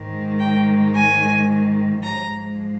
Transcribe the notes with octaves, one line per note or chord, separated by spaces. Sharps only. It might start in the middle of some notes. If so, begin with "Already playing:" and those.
Already playing: G#2 D#3 G#3
G5
G#5
G#2 F3 G#3 A#5